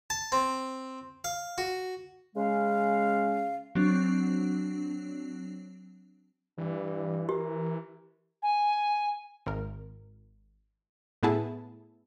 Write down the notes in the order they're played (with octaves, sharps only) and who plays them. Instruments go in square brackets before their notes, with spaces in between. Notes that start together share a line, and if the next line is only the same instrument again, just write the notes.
[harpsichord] A5
C4
F5
F#4
[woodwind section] C#3 G#3 C#4 F5
[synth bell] F#3 C4 D4
[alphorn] G2 [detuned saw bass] E3
[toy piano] G4 [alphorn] A#4
[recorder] G#5
[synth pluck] G#1 A#4
A2 A3 B3 E4 G#4 A5